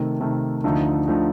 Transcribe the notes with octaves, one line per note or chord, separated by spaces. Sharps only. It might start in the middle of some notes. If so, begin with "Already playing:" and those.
Already playing: C3 D#3 A3
C3 D#3 A3
D2 D3 F3 A3 D#4
D3 F3 A3 D#4